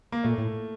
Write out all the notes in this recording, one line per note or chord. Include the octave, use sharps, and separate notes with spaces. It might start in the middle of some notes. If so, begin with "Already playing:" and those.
A#3
A#2 A3
A2